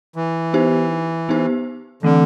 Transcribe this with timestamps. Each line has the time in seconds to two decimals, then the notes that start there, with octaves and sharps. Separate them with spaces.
0.16 E3
0.54 B3 D#4 G4 C5
1.29 B3 D#4 G4 C5
2.03 D3 E3 A3 C4